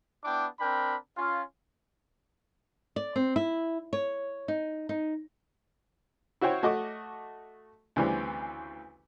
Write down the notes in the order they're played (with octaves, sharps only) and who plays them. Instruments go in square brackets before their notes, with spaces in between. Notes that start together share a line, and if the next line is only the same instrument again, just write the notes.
[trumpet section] B3 D4 E4 G5 D6
C4 D4 A#4 G5 B5
C#4 F4
[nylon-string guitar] D5
C4
E4
C#5
D#4
D#4
[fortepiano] E4 F#4 C5 C#5 G5
A3 F#4 D#5 A5 D6
D2 C#3 E3 G3 C4